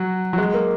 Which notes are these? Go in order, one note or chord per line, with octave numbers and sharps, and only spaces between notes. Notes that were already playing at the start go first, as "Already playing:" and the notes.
Already playing: F#3
F#3
G#3
A#3